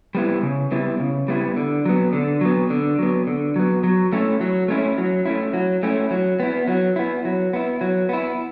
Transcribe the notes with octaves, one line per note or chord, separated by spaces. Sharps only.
G3 B3 E4
C#3
G3 B3 E4
C#3
G3 B3 E4
D3
F#3 B3
D3
F#3 B3
D3
F#3 B3
D3
F#3 B3
F#3
A3 C#4 E4
F#3
A3 C#4 E4
F#3
A3 C#4 E4
F#3
A3 C#4 E4
F#3
B3 E4
F#3
B3 E4
F#3
B3 E4
F#3
B3 E4